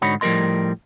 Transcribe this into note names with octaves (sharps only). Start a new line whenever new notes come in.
G#2 D3 D#4 F#4 C#5 B5
A2 F3 G3 A#4 D#5 C6